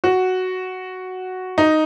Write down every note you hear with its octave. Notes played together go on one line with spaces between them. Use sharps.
F#4
D#4